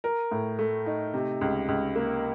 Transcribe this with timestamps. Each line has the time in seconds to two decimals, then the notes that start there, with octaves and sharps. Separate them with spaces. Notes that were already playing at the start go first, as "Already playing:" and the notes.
0.04 A#4
0.31 A2
0.59 A3
0.86 D#4
1.14 C3
1.41 C#2
1.68 C#2
1.95 A#3